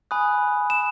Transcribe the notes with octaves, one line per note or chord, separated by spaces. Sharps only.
G#5 B5 D#6 F#6
E7